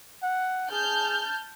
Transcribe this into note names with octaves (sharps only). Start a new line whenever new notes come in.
F#5
G#4 A5 F6 G6